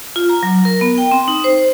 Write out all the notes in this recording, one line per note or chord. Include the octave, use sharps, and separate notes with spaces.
F4
A#5
F#3
A#4
B3
G5
C4
D#4
C5